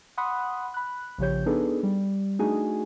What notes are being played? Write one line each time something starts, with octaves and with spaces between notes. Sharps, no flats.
F#5 B5 C6 D#6 F#6
B5 F#6
A#1 C#3 F3 G4 C#5 G6
B3 D4 D#4 G#4 A4 B4
G3
A3 D4 D#4 F#4 G#4 G#5